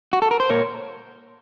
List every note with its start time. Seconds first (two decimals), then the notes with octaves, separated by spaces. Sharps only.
0.13 F#4
0.22 A4
0.31 A#4
0.40 C5
0.50 A#2 A#4 C#5